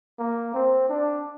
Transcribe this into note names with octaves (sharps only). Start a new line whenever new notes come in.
A#3
C4
D4